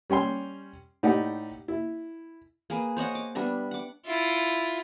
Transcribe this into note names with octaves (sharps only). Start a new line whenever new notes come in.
G3 C#4 G5 C6
A2 D#4 G4 D5 F#5
E4
A#3 G#4 B4
C5 C#5 D#5 F#5
D6
G3 B3 D4 E5
F#5 D6
E4 F4